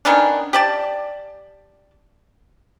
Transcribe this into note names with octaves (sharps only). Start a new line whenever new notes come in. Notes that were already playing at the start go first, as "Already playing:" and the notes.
D#3 B3 C#4 D4
G4 D5 A5